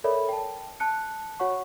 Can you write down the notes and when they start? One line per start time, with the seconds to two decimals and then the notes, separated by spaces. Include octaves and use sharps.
0.04 A4 A#4 C#5 D5 E5 B5
0.29 G5 A5
0.80 A5 F#6 C#7
1.39 F#4 C#5 F#5 C#6